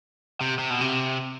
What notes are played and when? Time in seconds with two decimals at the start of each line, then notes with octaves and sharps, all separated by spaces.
0.41 C3
0.59 C3
0.70 B2
0.81 C3